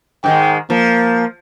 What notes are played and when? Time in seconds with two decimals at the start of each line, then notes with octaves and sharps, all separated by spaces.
0.24 G#2 D#3 G#3 G5
0.70 F3 A#3